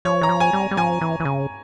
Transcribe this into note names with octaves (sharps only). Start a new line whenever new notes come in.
F3 C#5
E3 A#5
F3
G#5
G3
G3
F3 G#5
E3
E3
C#3